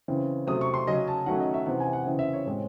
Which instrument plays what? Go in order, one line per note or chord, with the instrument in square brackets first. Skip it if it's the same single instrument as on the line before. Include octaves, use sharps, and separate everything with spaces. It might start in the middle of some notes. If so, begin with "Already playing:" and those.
[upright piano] C#3 E3 C4
C3 F#3 A3 C4 D#6
C#6
C6
C#3 F#3 C#4 D#5
A5
D#3 F#3 A3 C#4 F#5
D#5
E5
C3 E3 C4 F#5
G#5
F#5
C#3 E3 C4
E5
C#5
A2 G#3 C4